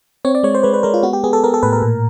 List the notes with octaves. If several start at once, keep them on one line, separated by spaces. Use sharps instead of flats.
C4 C#5
D5
G#3 C#5
C5
G#3 B4
B4
G#3 A#4
F4
B3 F#4
G4
B3 G#4
A4
B3 A#4
A4
A2 B4
A#4
A#2